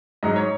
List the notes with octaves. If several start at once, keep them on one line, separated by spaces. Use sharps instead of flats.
G#2 F#3 D#4 D#5
C#5